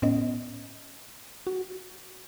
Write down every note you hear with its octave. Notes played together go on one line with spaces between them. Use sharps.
A2 B3 C#4 D#5
F#4